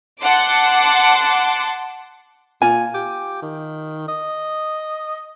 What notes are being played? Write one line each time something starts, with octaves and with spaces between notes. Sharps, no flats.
F#5 A5 C6 D6
A#2 F4 G#5
G4
D#3
D#5